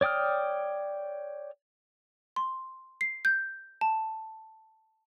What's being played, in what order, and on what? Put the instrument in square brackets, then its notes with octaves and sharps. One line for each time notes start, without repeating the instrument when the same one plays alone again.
[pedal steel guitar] C#5 D5 G5 D#6 F6
[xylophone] C6
C7
G6
A5